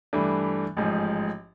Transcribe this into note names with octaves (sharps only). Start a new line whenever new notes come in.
G2 E3 A3 D4
A1 G#2 F3